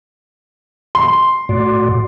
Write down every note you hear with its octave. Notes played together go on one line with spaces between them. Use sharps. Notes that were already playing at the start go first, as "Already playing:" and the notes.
C6
A2 F#4 D5